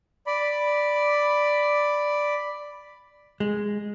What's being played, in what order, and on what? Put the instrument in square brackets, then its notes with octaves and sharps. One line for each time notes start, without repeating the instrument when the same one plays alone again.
[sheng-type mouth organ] D5 B5
[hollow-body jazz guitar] G#3